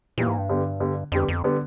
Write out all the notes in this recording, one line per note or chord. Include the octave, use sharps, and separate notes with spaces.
A#2 E3 G3 A#3
G#2
G2
D3 G3 B3
D3 G3 B3
F2 D3 G3 B3
F2
D3 G3 B3